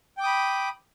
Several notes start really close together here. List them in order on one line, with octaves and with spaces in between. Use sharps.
G5 D6 D#6 B5